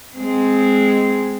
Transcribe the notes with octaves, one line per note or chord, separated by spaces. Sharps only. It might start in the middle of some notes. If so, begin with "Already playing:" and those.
G#3 C4